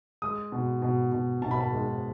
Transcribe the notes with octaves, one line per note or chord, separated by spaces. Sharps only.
G#3 D#6
B2
B2
B2
B2 A5
B5
A5
G#3